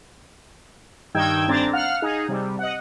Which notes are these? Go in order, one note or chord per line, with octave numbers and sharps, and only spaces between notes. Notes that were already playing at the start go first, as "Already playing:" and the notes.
G2 D#3 D#4 G5 E6 G#6
G1 C4 D4 A#5 A6
F5 F#5 F6
D#4 G#4
C3 G3
D#5 F#5